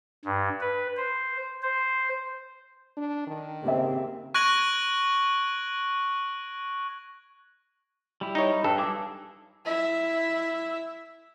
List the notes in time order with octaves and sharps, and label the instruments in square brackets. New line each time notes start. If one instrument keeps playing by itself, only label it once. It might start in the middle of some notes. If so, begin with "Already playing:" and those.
[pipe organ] G2
B4
C5
C5
[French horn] D4
D#3
[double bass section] C#3 A#3 C4 [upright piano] G4 E5
[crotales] C#6 F#6 G#6 A#6 D7 F#7
[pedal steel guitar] G3 E4
[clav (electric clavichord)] D#4 C#5
[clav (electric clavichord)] G2 [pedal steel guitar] A4
[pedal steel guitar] G#4 D6 E6
[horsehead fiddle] E4 E5